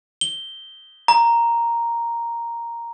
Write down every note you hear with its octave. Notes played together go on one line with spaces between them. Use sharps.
G7
A#5